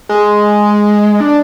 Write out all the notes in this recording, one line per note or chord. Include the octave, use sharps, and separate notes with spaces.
G#3
D4